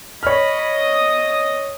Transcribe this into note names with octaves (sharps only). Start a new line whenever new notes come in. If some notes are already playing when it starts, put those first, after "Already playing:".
C#5 D#5 B5 F6
D#6